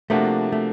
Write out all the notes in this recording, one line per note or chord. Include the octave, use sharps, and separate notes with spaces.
C3 F3 A3 A#3 D4 F#4
A3